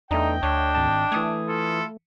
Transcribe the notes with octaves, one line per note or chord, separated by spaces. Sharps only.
E2 A3 D4 D#4 D#5 G5
D2 D4 C#5
G#1 A5
E3 A3 D#6 G#6
E4 F4 A4